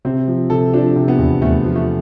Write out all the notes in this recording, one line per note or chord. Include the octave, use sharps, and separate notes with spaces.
C3 C4
F3
C3 A4
F3 D4
C3
B3
E2
E2 A3
F3
A3